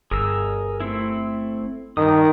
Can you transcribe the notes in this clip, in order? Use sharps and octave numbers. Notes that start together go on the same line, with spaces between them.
G1 G#4 A#4 E6
A3 C4 E4
G2 D#3 D#6